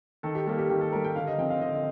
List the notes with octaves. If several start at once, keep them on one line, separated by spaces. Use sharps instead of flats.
D#3 A4
G4
G3 A#3 A4
G4
D#3 G4
A4
G3 A#3 A#4
G5
D3 F5
D#5
F3 C4 G5
F5
D3 D#5
D#5